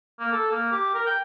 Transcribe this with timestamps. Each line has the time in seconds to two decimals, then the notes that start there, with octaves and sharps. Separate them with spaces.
0.19 A#3
0.32 A4
0.51 A#3
0.72 G4
0.94 A#4
1.06 G5